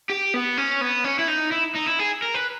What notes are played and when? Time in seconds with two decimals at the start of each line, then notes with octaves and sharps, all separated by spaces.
0.10 G4
0.34 B3
0.58 C#4
0.81 B3
1.04 C#4
1.19 E4
1.28 D#4
1.52 E4
1.75 D#4
1.87 E4
1.99 G#4
2.22 A#4
2.35 B4